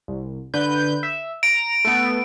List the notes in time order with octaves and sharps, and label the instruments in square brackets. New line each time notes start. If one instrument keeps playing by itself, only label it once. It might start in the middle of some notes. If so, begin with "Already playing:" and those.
[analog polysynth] C2
D3 B4 G6
E5
[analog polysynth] A#5 [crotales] D7
[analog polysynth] A3 B3